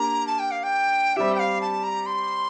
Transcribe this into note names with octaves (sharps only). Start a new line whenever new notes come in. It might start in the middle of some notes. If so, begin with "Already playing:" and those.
Already playing: A#3 D4 G4 A#5
A5
G5
F5
G5
G3 C4 G4 E5
G5
F5
A5
A#5
C6